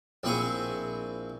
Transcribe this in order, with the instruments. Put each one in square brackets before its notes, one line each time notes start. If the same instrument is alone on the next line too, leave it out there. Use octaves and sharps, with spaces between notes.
[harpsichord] A#1 C4 E4 G#4 G#5 C#6